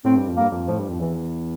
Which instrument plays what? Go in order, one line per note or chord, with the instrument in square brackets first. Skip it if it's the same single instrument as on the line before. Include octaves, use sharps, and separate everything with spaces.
[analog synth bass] A2 [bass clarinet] C4
[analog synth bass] G2
F2
[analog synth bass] G2 [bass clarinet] A#3
[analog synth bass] F2
[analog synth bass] A2 [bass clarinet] F3
[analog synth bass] G2
F2
[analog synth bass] E2 [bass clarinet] E3